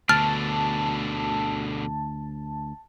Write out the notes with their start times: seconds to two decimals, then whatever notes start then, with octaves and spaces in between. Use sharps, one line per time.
0.09 D2 B2 D3 A5 F6